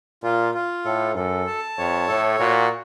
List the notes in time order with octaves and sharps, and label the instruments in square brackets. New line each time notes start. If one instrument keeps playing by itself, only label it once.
[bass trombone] A#2 [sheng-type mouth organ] F4
[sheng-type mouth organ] F4
[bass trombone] A2 [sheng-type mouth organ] A4
[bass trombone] F#2 [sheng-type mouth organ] A4
[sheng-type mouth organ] A5
[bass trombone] F2 [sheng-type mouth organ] C#5
[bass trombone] A2 [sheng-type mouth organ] A4
[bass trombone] A#2 [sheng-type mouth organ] F#4